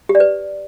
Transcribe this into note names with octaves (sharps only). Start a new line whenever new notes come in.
G4
D5
B4